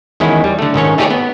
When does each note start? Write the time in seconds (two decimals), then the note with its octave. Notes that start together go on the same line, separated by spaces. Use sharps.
0.20 E2 D#3 G#3 C#4 E4
0.44 G3
0.59 D3 A3
0.74 G#2 D#3 C#4 C#5
0.98 A3 D#4 G4 G#4 C#5 D5
1.10 B3